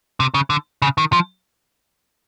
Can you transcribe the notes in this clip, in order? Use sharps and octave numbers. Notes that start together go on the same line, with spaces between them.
C3
C#3
D3
C#3
D#3
F3